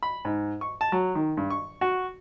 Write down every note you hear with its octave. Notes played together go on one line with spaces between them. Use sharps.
B5
G#2
C#6
A5
F#3
D#3
G2
C#6
F#4